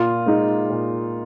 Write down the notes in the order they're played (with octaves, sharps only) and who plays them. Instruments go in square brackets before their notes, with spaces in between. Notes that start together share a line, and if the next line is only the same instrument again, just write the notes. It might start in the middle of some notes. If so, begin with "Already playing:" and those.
Already playing: [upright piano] A#2 [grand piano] F4
[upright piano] G#3 D#4
A#2